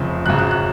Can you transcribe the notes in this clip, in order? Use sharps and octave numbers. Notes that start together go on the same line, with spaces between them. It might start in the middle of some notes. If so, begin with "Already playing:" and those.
Already playing: F1 F2 C#3 F3
G#1 F#2 C#3 F#6
F#6
F#6